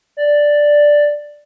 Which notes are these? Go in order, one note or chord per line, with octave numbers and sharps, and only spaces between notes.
D5